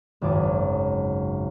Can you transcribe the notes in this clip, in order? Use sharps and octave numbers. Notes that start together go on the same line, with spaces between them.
G#1 C#2 F#2 D6 A6